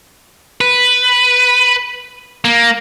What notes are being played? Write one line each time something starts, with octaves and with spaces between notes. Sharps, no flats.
B4
A#3